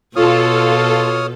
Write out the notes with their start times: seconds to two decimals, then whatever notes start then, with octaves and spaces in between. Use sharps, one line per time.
0.16 B2 F4 A4 C#5 D#6 F6